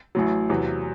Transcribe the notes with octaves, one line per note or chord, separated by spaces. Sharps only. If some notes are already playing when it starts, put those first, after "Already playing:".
A1 A2 F#3
E2 C3 F#3